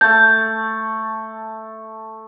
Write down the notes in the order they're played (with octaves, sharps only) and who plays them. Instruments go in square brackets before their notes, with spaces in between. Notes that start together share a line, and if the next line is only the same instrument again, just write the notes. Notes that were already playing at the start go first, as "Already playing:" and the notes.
[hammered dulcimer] A3 A5 [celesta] G6